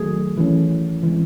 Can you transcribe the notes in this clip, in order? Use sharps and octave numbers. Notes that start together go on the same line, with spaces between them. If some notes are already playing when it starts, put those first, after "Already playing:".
Already playing: D#3 F#3 A3 G#4
E3 A3 C#4
E3 G#3 C4